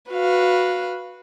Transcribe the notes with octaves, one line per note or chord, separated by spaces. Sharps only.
F#4 B4 F5